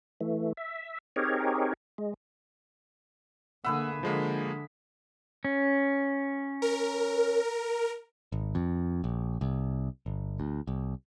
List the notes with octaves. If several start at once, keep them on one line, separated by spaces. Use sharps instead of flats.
E3 A3
E5
C4 D#4 G4 G#4 A#4 C#5
G#3
D3 A#3 G#4 B4 E5 F#5
D3 F3 G#3 A#3
C#4
A#4
G#1
F2
A#1
C2
G1
D2
C2